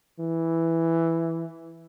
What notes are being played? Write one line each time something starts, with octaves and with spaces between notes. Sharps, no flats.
E3